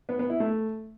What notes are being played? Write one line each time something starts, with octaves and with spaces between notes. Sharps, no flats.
B3
B3
E4
A3